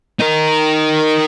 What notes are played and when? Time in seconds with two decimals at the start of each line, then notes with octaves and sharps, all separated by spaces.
0.20 D#4 A#4